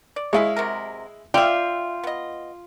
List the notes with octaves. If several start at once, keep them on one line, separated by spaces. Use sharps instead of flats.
D5
G#3 E4 C#5 D#5 F5
C3 F#3 A#4
F4 D5 E5 G5
B3 D#5